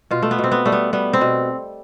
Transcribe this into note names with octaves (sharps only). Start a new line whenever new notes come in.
B2 F4
A3
B3
B2
C4
B3
G3 A3
B3
G3 B3
C4
B2